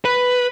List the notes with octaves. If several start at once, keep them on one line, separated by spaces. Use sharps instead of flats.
B4